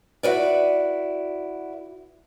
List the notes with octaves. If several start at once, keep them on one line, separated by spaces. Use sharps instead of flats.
E4 F#4 B4 D5